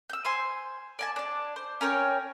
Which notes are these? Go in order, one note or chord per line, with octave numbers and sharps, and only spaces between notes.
E6 G6
C5 G#5 C6
D5 G#5 A5
D4 D5
C5
C#4 A#4 C#5 G5